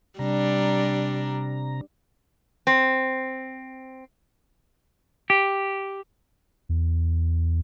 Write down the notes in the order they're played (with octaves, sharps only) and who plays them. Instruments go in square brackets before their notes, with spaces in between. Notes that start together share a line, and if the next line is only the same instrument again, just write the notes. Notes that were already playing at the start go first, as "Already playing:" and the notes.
[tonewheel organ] C3 A#5 [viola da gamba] G3 D4
[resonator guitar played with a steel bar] C4
[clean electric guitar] G4
[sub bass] E2